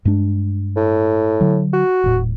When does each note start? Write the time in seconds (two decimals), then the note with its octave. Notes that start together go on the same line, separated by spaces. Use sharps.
0.05 G2 G#3 D4
0.76 A2
1.41 D3 F#3
1.73 F#4
2.04 D#1 A2